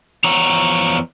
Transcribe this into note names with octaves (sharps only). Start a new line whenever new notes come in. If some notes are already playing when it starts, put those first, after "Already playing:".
E2 F3 C#5 A#5